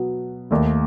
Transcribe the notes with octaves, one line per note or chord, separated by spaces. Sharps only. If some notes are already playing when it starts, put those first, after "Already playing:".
Already playing: B2 F#3 B3
D#2 D#3 A3